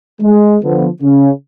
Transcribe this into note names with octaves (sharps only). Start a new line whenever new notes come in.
G#3
D3 F3 B3
C#3